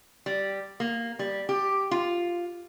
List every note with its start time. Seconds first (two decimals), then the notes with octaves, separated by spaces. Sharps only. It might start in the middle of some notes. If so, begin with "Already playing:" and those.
0.26 G3
0.80 A#3
1.19 G3
1.49 G4
1.91 F4